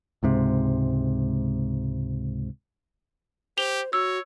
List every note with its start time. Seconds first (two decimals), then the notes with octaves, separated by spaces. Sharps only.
0.23 C#2 G#2 C3
3.58 G4 C5 F7 G7
3.93 F#4 C#5 E6